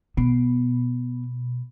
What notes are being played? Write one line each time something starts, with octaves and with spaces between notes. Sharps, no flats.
B2 B3